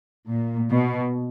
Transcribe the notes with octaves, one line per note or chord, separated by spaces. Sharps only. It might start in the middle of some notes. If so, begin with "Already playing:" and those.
A#2
B2